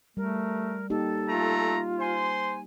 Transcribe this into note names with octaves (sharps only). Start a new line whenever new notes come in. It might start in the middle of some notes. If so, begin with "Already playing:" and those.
G3 A3 A#4
A#3 D#4 G4 A4
A3 F4 A#5
C5 G#5 C6